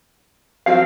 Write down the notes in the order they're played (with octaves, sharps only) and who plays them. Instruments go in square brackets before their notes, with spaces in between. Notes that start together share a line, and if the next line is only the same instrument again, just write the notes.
[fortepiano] F3 F#3 C4 [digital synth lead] F5